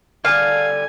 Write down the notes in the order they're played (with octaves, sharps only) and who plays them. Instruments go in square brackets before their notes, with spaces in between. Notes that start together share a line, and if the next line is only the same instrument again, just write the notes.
[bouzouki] D3 G3 A5 [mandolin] F5 [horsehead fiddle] G#5